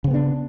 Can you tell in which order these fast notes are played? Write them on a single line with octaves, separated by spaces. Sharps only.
C#3 C4 B3 D4